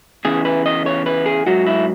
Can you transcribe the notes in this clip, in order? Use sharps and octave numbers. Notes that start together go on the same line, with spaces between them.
E2 C#3 E3 G#4
B4
D#5
C#5
B4
G#4
G#2 F#3 F#4
E4